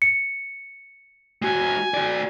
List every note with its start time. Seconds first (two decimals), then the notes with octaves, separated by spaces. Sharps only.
0.02 C#7
1.42 G#3 F#4 G#5
1.94 F#4 D5